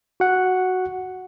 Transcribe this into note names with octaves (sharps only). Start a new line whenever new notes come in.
F#4 F#5